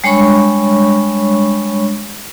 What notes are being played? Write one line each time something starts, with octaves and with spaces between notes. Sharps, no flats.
G3 G#3 D4 C#5 B5 C#6